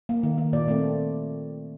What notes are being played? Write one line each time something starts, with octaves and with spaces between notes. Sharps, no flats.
A#3
D#3
A#3
A#2 D5
A3 C4